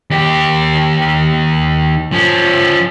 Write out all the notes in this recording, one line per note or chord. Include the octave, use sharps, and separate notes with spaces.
D#2 G4
F3 C#4